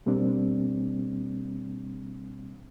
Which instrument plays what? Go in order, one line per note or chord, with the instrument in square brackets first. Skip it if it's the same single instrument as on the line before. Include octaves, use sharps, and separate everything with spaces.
[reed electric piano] B2 G3 A#3 C4 D4